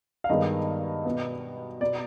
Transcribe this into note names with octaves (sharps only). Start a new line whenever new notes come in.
F5
G2 D#3 G#3 B3 D#5
B2 B3
B2 B3 D5